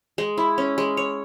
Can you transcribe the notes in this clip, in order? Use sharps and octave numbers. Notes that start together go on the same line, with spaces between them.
G#3
E4
C#4
G#3
C#5